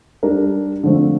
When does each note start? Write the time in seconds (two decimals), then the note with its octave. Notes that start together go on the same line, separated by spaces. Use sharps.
0.23 G3 D4 G4 A#4
0.84 D3 F3 A3 C4